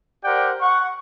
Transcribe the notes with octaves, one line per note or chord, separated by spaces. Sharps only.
G4 A#4 C5 D5 F#5 G5
F#5 C#6